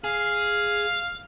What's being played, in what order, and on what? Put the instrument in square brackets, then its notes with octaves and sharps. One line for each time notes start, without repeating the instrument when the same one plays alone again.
[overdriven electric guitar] G#4 [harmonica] F5